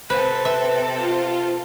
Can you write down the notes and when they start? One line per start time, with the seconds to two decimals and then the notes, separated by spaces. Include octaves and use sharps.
0.10 C3 C4 A4 B4 C5
0.45 B4 E5
0.96 F4 C5